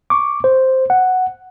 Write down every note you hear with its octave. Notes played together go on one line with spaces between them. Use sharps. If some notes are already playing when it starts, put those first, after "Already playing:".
C#6 D6
C5
F#5